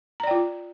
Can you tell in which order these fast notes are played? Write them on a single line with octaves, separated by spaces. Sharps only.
A#5 D5 G5 F4